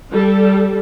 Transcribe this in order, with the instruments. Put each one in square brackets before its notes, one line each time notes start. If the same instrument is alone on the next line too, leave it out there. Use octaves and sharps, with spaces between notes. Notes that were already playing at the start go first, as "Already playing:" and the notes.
[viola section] G3 A4